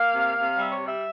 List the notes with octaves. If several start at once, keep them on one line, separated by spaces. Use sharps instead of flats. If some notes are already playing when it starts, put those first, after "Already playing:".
Already playing: A#3 F5
C3
C3
G3 E5
C#5
G3
E5